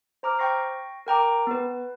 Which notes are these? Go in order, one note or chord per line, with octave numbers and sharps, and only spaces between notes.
C5 A#5 D6 F6
G5 C#6 A#6 C7
A#4 G5 A#5 D6
B3 B4